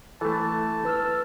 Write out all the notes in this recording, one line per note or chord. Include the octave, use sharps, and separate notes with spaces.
E3 A3 A4 A5
B4 E6 F6